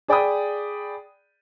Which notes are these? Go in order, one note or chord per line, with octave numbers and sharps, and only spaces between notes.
G#4 D5 G5 B5 D#6